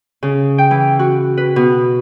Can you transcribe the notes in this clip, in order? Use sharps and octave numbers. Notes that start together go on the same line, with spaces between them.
C#3
G5
E3
F#4
B4
B2